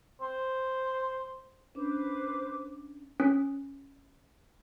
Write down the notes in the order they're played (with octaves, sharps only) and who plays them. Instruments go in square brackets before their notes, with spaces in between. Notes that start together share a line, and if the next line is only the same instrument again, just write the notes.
[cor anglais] C5
[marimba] C#4 D4 [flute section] B4 C5 D6
[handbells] C#4